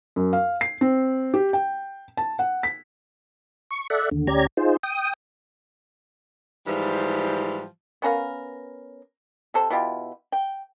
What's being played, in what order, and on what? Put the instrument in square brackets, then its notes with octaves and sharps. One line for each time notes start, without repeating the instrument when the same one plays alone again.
[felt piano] F#2
F5
C7
C4
G4
G5
A5
F#5
B6
[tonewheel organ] C#6
A4 D5 E5 F#5
D#2 D3
D2 C#4 G4 D5 A#5 G#6
D#4 F4 G#4 C5
G5 D#6
[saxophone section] G#2 E3 F3 G3
[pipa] B3 C#4 A#4 F5
C3 A4 C5
B2 E4 F4 G4
G5